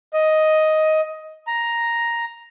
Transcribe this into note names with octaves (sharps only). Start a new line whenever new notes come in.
D#5
A#5